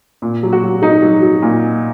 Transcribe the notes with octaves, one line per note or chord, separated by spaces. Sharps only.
A#2
F#3
F#4
F#3
F#3 D#4
F#3
F#3
A#2